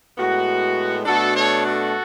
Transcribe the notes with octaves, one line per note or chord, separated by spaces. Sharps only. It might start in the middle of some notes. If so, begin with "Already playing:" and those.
A2 G#3 B3 F#4
B2 A3 D4 F#4 A4
A4 C#5
F#4 A4